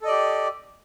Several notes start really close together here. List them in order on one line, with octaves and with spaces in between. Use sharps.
A4 D#5 D5 G4